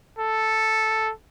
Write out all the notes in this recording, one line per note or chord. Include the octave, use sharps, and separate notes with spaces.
A4